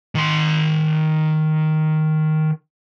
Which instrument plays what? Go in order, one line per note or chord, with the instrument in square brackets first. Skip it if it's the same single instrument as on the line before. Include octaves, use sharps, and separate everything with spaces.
[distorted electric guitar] D#3 C6